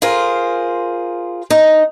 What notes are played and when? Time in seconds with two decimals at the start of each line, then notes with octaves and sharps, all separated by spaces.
0.02 F4 G#4 A#4 C5
1.50 D#4